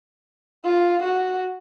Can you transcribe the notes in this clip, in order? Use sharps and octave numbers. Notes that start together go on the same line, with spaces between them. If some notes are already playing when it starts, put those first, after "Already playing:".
F4
F#4